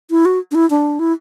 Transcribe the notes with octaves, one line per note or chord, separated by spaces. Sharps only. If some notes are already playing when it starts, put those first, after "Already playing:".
E4
F#4
D4
E4
D4
E4